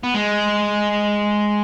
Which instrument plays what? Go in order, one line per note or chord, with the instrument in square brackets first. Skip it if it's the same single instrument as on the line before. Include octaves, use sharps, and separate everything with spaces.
[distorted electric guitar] B3
G#3